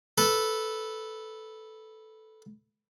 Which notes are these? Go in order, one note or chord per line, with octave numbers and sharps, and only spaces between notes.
A4 B4